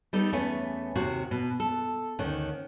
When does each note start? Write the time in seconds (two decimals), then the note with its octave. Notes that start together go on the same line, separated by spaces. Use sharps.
0.13 G3 B3 D#4 A4
0.32 E2 A3 B3 C#4 G#5
0.95 D#2 C3 F#4
1.31 B2
1.60 A4
2.19 D2 D#3 C#4 F#5